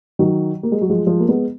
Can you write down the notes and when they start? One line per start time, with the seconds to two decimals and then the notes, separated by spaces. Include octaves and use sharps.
0.19 D#3 F#3
0.63 A#3
0.72 G#3
0.81 F#3
0.90 F3 G#3
1.06 F3 G#3
1.19 A#3
1.29 G#3 B3